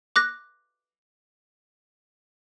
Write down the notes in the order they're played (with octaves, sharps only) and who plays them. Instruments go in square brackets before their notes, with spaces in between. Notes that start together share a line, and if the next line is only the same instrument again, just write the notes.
[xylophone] D6 F#6 A#6